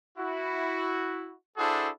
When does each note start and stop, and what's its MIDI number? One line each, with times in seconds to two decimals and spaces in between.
0.18 1.33 64
0.18 1.33 66
1.58 1.89 62
1.58 1.89 64
1.58 1.89 66
1.58 1.89 68
1.58 1.89 69
1.58 1.89 72